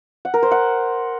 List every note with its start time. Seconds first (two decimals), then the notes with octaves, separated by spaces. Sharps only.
0.25 F#5
0.34 A#4
0.43 C5
0.51 F#5